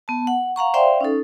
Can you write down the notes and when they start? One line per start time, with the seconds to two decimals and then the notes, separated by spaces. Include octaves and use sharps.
0.08 B3 A5
0.27 F#5
0.56 F5 F#5 A#5 C#6
0.74 C5 D5 E5 F5 G5 C6
1.01 C#4 D#4 A4